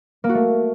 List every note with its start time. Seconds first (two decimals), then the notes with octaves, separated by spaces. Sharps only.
0.24 A#3
0.29 F#4
0.35 A3